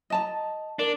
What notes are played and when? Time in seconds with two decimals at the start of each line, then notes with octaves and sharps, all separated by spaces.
0.10 D#5 A5 A#5
0.79 D4 A#4